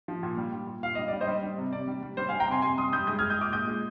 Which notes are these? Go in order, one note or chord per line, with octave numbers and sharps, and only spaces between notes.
F3
A#2
G3
G3
A#2
A#2 F5
G3 D#5
G3 D5
C5 D#5
G3
G3
C3
C3 D5
G3
G3
G3 C5
F5 G#5
G3
G5 A#5
C3 G#5 C6
C3 G#5 C6
G3 C6 D#6
G3 D#6 G6
G#3 D#6 G6
F6 G#6
G#3
D#6 G6
A#2 D6 F6
A#2 D#6 G6
G#3